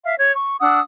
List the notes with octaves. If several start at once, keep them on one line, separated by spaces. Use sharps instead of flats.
E5 F5
C#5 G#6
C#6
D4 F#5 D#6 E6